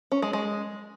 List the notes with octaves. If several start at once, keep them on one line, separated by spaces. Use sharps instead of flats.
C#4
G#3
G#3